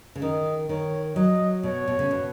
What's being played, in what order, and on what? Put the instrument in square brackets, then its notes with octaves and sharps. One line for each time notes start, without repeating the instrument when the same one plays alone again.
[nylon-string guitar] C#3
[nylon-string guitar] D#3 [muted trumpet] D#5
[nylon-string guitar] D#3 [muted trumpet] C#5
[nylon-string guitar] F#3 [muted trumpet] D#5
[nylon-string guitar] B2 [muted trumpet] C#5
[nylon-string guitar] B2
C#3
B2